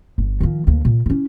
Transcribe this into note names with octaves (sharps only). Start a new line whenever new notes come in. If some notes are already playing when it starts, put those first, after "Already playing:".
G1
D#3 F3
D2 A#3
A#2
C#4 E4